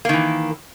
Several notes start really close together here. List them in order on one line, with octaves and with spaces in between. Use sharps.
A#3 D#3 E3